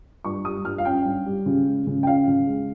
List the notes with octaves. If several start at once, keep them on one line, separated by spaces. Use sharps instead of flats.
G2 C#6
G3 D#6
G2 F6
F5
C#4 G5
G2
G3
C#3
G#3
C#3
G5
C#4 F5
C#3
G#3